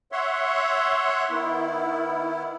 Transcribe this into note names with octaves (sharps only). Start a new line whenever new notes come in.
C#5 E5 F#5 C6
D#3 B3 E4